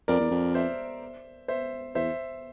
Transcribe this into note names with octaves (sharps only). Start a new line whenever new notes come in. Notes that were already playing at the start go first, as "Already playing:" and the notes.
F2 A#4 D5
E2
F2
C5 E5
C5 E5
E2 C5 E5